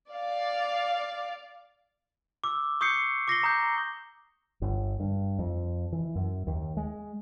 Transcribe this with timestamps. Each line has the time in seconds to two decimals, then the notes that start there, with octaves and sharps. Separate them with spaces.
0.11 D5 F5
2.44 D6 E6
2.81 C#6 D#6 G6 C7 C#7
3.28 D6 A#6 C7 G7
3.43 A#5 D#6 G6
4.62 G1
5.00 G2
5.39 F2
5.92 E3
6.15 F#2
6.47 D#2
6.77 G#3